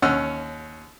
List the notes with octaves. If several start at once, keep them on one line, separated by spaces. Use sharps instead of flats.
D#2 C#4 F#5 E6 F6